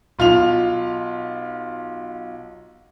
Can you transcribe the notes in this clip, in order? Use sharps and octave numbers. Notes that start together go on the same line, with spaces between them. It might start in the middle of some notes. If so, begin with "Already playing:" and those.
B1 F4 F5 F7